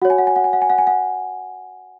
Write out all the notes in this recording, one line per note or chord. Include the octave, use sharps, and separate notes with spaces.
F#4 C#5 F#5
G#5
F#5
G#5
F#5
G#5
F#5
G#5
F#5
G#5
F#5